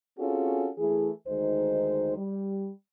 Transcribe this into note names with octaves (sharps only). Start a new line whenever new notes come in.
C4 C#4 F4 F#4 G#4 A4
E3 A3 E4 G#4
D2 D#3 G#3 D#4 C5
G3